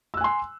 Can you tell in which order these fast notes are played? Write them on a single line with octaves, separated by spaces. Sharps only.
E6 F#6 G#5 C6